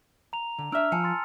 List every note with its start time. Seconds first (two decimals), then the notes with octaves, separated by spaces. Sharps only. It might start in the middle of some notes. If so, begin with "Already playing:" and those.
0.33 A#5 F7
0.58 D3
0.72 D4 E5 E6 F6
0.92 F3 G#5 A5 C#7
1.04 C6 A6